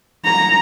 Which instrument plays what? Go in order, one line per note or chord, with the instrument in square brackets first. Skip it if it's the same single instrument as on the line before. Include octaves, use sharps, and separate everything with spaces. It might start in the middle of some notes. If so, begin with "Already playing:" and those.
[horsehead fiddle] A#5